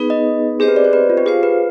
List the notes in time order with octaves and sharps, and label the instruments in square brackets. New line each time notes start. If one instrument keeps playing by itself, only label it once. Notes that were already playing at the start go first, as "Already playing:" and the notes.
Already playing: [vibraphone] B3 D#4 G#4 B4
[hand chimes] D#5
[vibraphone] C4 G4 C5 D#5 [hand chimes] G#4
[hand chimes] B4
D5
C5
B4
F4
G4
[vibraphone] F4 C5 F5 [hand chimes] G#4
[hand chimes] B4